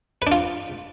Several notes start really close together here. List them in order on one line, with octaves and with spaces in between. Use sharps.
B4 D4 F4